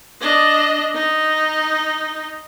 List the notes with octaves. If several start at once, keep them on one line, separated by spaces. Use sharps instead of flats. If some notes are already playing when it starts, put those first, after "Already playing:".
D4 D#5
D#4